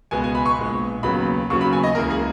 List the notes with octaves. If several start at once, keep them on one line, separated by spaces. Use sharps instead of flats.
C#2 B2 G#3 B3 G#5
G#5
B5
C#6
A#1 A#2 G#3 B3
D#2 C#3 F#3 B3 B5
D#2 C#3 F#3 B3 C#6
B5
G#5
D#5
C#2 C#3 E3 A#3 A#4
G#4